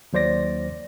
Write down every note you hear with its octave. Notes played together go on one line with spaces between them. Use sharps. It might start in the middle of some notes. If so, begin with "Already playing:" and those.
D#2 F#3 C5 D5 A#6